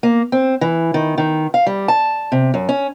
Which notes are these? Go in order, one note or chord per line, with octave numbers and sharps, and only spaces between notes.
A#3
C4
E3
D#3
D#3
F5
G3
A5
C3
F#2
C#4